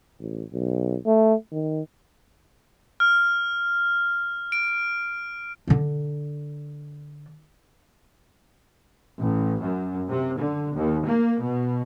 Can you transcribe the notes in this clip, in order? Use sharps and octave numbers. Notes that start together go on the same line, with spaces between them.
A1
B1
A3
D#3
F6
D7
D3 D4
A1
F#2
C3
D3
D#2
A#3
B2